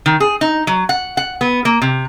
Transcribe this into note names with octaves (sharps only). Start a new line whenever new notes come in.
D#3
G#4
D#4
F#3
F#5
F#5
B3
A#3
C3